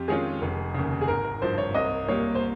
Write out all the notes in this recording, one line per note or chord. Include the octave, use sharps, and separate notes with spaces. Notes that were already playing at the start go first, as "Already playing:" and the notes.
Already playing: F2 G4
D#3 G#3 C#4 F4 G#4
F1
D#2 C#3
G#4
G#1 A#4
A#4
G2 F3 C5
C#5
C2 D#5
A#2 G3 A#3 C#5
C5